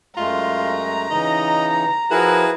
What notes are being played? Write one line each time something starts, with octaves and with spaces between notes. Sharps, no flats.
F#2 G#3 A3 F4 A#5
C#3 E3 D#4 D#5
F3 E4 F#4 G#4 A#4 B4